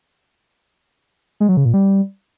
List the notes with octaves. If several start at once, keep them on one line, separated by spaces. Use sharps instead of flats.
G#3
F#3
C#3
A#2
G3